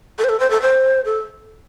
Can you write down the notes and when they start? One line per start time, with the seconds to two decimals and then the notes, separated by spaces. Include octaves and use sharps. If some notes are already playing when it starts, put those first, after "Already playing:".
0.19 A4
0.24 C5
0.29 A4
0.40 C5
0.50 A4
0.62 C5
1.05 A4